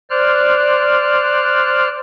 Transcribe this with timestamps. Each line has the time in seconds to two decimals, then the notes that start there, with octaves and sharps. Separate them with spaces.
0.10 C5 D5 F6 F#6